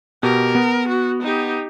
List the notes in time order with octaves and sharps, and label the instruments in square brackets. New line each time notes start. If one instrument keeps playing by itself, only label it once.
[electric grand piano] B2 G4 [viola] A#4
[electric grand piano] B3
[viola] F#4
D#4 G4